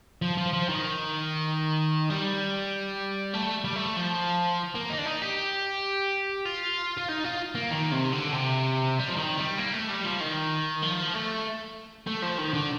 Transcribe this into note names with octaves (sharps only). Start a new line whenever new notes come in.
F3
F3
F3
D#3
G3
A3
G3
A3
F3
A#3
D#4
D4
D#4
G4
F4
F4
D#4
F4
A#3
D#3
C3
D3
C3
G3
F3
D#3
G3
A#3
A3
G3
F3
D#3
F3
A3
A3
F3
D#3
D3